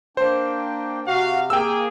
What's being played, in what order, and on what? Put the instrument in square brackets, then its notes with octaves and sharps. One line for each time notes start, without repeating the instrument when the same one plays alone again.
[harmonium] A#3 D4 G5 [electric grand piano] C5
[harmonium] C3 [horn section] F#4 F5
[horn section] A#3 G#4 [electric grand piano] G5 E6